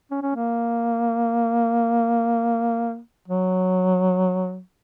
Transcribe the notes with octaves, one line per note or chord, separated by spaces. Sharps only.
C#4
C#4
A#3
F#3